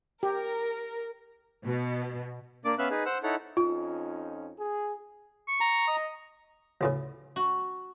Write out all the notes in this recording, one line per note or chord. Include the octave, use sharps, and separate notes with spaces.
G4 A#4
B2
A#3 D4 D5 D6
B3 C#4 B4 E5 F5 F#6
D#4 G#4 B4
C5 F#5 E6
D#4 E4 A4 C#5 F#5
F2 C#4 D#4 F4
G#4
C#6
A#5
D#5
D2 A2 C#3
F#4